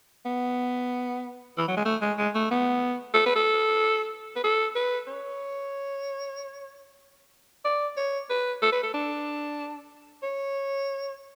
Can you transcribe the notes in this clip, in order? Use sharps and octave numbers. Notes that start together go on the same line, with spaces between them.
B3
E3
F#3
G#3
A3
G#3
G#3
A3
B3
A4
B4
A4
B4
A4
B4
C#5
D5
C#5
B4
A4
B4
A4
D4
C#5